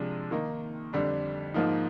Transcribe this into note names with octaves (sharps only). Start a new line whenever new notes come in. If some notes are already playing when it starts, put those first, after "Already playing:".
Already playing: C3 F3 G#3 D4
D#3 A#3 D#4
F2 D3 G3 D4
G#2 F3 A#3 D#4